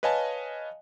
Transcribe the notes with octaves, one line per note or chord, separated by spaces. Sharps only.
B4 C#5 D#5 F5 G#5 A5